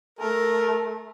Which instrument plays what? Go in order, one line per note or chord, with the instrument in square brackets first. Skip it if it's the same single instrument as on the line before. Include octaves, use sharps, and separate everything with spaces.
[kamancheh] A3 [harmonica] A#4